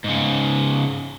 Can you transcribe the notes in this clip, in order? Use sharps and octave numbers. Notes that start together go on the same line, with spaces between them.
G#2 C#3